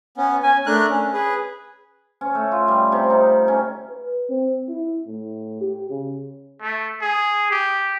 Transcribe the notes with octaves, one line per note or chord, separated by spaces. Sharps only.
B3 C#4
C#4 G#5
A3 D4 A#4 F#6
C#4
G#4 B4
C#4
A3
F4
G3
C3
D#4
C#4
B4
C4
E4
A2
G4
C#3
A3
G#4
G4